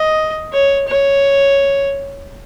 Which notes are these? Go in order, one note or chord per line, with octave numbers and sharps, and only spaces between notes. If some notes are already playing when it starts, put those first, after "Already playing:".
Already playing: D#5
C#5
C#5